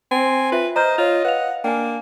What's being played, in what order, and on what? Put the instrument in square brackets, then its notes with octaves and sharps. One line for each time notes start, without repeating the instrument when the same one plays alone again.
[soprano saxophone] C4 [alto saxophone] G#5
[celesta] F4 E5 [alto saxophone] B4
[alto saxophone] C5 [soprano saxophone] D#5 [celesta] A#5 F6 G6
[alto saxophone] F4 [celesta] C#5 F7
[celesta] B4 F5 F7 [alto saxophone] F#5
[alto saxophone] A#3 [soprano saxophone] D4 [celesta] G5 G#5